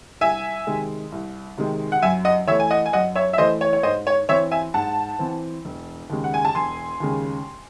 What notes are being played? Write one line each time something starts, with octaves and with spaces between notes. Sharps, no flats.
C2 E5 G#5
C3 D#3 G#3
C2
C3 D#3 G#3
F#5
F#2 E5 G#5
D#5 F#5
E3 A3 C#5 E5
G#5
D#5 F#5
G#5
F#2 D#5 F#5
C#5 E5
E5
E3 A3 C5 D#5
C#5
C#5
G#2 C5 D#5
C#5
E3 C4 C#5 E5
E5 G#5
G#2 F#5 A5
E3 C4
E1
D#2 C#3 G#3
F#5
G#5
A5
E1 G#5 C6
D#2 C#3 G#3